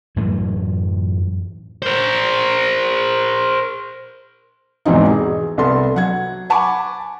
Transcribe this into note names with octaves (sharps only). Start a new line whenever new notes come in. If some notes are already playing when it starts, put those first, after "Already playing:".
F#2 A2 E3 A3
A#4 C5
E2 G#2 B2 E3 C4 D#4
G#4
C2 B3 A4 C6
F#3 F#5 G#6
F#5 G#5 A5 B5 C#6 D6